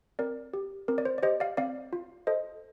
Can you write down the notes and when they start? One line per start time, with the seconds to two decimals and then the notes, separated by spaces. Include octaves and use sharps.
0.19 C4 A#4 D5
0.54 G4
0.88 C4 A#4
0.98 D5
1.05 C5
1.18 D5
1.23 G4 C5 D#5
1.40 D5 F5
1.57 C4 D5 F5
1.93 F4
2.27 A4 C5 D#5